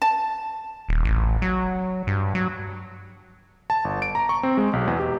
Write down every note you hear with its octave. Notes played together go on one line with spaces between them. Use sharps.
A5
D#1
A1
F#3
G2
F#3
A5
G1
D7
A#5
C#6
C4
G#3
B1
E2
G4